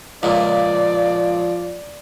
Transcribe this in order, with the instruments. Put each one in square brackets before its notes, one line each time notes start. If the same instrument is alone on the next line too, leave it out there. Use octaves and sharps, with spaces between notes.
[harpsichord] C#2 A#2 [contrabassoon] F3 [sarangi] D5